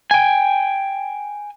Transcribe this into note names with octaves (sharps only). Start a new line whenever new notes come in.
G5 G#5